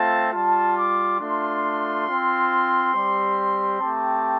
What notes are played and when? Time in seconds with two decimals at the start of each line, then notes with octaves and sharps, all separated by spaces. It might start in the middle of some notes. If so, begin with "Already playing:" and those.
Already playing: A3 C4 F4 A5
0.32 G3 F4 A5
0.76 D6
1.19 A3 D4 F4 C6
2.06 C4 F4
2.94 G3 C4 G4
3.80 A3 C4 G4 A5